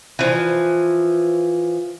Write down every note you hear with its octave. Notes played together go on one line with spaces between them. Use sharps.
E3 F3